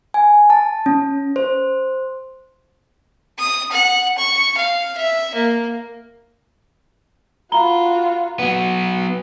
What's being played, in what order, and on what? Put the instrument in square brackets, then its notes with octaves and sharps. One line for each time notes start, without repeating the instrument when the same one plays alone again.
[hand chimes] G#5
A5
C#4
C5
[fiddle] D#6
F#5
C#6
F5
E5
A#3
[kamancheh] F4 F#4 [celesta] A#5 B5 G7
[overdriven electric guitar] F#3 B3